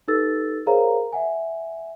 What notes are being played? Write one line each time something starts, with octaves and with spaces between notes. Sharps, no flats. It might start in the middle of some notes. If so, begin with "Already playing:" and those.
D#4 G4 A4 B4 E6 A6
G#4 A#4 C5 C#5 F5 A#5
E5 F#5 G#5